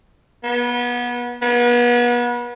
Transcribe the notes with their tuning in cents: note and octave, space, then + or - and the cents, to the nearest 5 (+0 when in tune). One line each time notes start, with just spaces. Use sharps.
B3 -25
B3 -35